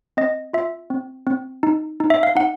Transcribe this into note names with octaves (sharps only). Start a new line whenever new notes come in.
C4 D#5
F4 E5
C4
C4
D#4
D#4
E5
F5
D#4 F#5